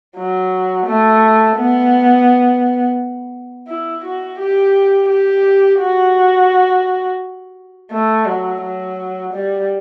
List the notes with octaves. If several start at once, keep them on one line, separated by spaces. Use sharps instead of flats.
F#3
A3
B3
E4
F#4
G4
G4
F#4
A3
F#3
F#3
G3